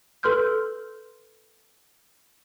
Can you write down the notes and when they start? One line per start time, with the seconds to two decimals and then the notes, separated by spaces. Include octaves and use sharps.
0.23 A4 B4 C6 F6 G6